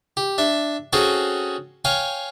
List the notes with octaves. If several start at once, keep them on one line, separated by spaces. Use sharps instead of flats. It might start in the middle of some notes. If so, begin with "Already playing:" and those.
G4
D4 E5
C4 C#4 F#4 G#4 A4 C5
C#5 F5 G5 G#5